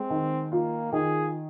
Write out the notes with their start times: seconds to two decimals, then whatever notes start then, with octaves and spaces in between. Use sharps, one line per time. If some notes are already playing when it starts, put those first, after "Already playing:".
Already playing: G#3 C4
0.10 D#3
0.51 A#3 F4
0.92 D#3 G#4